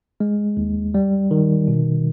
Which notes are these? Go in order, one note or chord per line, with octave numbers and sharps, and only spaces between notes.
G#3
D#2
G3
D#3
B2